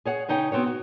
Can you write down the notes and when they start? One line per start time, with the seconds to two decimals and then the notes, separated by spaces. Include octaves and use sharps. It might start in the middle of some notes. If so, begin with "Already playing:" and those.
0.05 G#4 C#5 F#5
0.29 C#3 D#4 C#5 G5
0.52 B3 C4 F#4 C#5
0.67 F#4